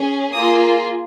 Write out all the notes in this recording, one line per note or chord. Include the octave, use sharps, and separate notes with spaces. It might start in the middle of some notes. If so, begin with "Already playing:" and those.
Already playing: C#4 G#4
A#3 F4 G#4 D#6